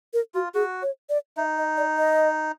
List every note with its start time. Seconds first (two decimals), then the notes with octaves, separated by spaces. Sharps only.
0.13 A#4
0.34 F4 F#4
0.54 F#4 G#4
0.82 C#5
1.09 D5
1.37 D#4 E5
1.58 D#5
1.77 D5
1.98 D#5